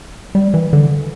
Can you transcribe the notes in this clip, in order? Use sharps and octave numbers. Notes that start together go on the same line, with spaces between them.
G3
E3
D3